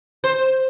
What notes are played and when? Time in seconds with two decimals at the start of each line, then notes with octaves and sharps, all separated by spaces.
0.24 C5